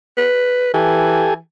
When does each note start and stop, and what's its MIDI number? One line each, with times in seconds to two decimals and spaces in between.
0.18 0.70 71
0.74 1.38 52
0.74 1.34 67
0.74 1.34 69
0.74 1.34 80